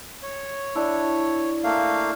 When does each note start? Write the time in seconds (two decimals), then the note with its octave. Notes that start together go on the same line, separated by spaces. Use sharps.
0.23 C#5
0.75 D4 E4
1.64 A3 A#3 F5